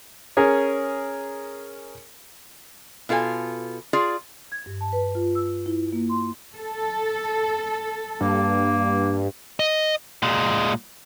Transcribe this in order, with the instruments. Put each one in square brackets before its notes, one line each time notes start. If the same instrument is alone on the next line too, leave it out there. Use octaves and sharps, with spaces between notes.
[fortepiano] C#4 G#4 A#4
[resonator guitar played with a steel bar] B2 F4 A4 A#4 G#5
F4 G#4 D5
[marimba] G#6
G2
A5
B4
F4
E6
E4
A#3
C6
[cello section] A4
[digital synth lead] G2 [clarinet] A#3
[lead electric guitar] D#5
A#2 G#3